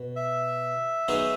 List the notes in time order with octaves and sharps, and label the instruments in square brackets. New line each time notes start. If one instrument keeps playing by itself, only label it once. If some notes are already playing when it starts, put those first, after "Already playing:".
Already playing: [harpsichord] B2
[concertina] E5
[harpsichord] F#3 B3 D#4 G#4